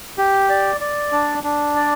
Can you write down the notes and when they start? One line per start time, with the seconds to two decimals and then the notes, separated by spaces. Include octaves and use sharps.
0.18 G4
0.50 D5
0.81 D5
1.12 D4
1.44 D4
1.75 D5